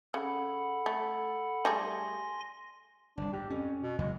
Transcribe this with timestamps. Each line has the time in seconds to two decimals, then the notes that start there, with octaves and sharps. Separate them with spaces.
0.14 C#3 A4 F#5 B5
0.86 A3
1.65 G3 A3 G#4 G#5 C6 A#6
3.17 G1 C2 D4
3.33 G#2 G4
3.50 F2 C#4
3.83 B2
3.99 F#2 C#3 F#3 G#3